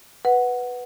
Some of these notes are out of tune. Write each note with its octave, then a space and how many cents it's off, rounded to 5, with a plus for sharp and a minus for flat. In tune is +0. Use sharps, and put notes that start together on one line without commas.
B4 +0 F#5 +0